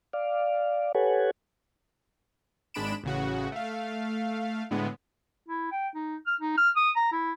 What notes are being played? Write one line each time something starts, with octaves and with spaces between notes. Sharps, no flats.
D5 F5
G4 A4 B4 C#5 F#5 G#5
G#1 G#3 D4 B5 D7 E7
A1 C#3 F#4
A3 F5
A2 D3 G#3 B3
E4
G5
D#4
F6
D#4
F6
D#6
A#5
E4